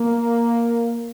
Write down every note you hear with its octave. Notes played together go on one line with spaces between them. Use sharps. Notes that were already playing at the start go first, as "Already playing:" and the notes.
Already playing: A#3